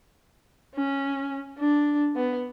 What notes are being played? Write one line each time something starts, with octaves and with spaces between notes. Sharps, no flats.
C#4
D4
B3